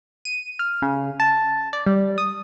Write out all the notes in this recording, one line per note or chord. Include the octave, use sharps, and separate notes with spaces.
D#7
F6
C#3
A5
D5
G3
D#6